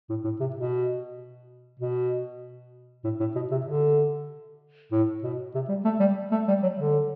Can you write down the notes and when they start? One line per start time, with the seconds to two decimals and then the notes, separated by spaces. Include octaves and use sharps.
0.10 A2
0.24 A2
0.40 C3
0.56 B2
1.80 B2
3.04 A2
3.20 A2
3.35 B2
3.51 C3
3.66 D3
4.92 A2
5.23 B2
5.55 C3
5.69 G3
5.85 A3
6.00 G3
6.32 A3
6.48 G3
6.63 F#3
6.79 D3